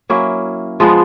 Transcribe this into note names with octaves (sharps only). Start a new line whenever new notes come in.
F#3 A#3 C#4 E4
F3 G#3 B3